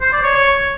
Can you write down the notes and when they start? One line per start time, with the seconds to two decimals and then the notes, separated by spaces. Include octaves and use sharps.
0.01 C5
0.12 D5
0.23 C#5
0.35 C#5